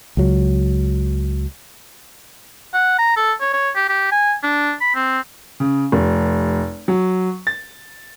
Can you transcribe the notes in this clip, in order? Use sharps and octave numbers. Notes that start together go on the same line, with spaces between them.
C#2 F#3
F#5
A#5
A4
C#5
C#5
G4
G4
G#5
D4
B5
C4
C#3
F1
F#3
A6